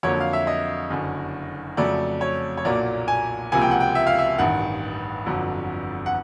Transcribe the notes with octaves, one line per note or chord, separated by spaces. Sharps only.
F2 D3 F#3 A#3 C#5
F5
E5
D#5
F#1 F#2 D3
F2 C#3 F#3 A3 D5
C#5
C#5
B1 A#2 F#3 A#3 D5
G#5
C#2 C3 F3 A#3 G#5
G5
F#5
G5
E5
F5
E5
A1 G2 D#3 F#5
G1 F2 D3 F#3
F#5